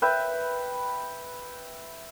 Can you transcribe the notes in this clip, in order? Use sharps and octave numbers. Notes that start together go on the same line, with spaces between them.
B4 E5 G5